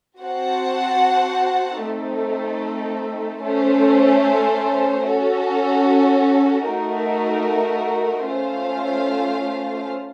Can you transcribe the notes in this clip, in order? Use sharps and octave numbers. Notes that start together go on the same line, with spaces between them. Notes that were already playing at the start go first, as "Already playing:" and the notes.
C4 F#4 C5 F#5 A5
A3 C4 D#4 A4
A3 C#4 A4 C5
C#4 F#4 A4
A3 D#4 F#4 A#4
A3 C#4 F4 C5 F5